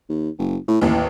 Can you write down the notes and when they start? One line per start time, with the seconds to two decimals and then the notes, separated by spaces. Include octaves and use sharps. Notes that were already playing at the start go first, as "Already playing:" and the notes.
0.09 D#2
0.39 F#1
0.68 A2
0.81 A1 D#2 E3